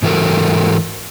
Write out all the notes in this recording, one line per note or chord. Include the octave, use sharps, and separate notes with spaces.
G#2 E3 F#4 A4 A#4